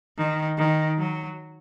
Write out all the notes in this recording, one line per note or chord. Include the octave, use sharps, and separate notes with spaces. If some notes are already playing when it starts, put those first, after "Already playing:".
D#3
D#3
F#3